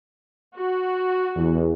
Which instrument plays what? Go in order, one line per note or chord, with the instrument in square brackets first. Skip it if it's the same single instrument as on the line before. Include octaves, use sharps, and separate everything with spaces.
[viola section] F#4
[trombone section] E2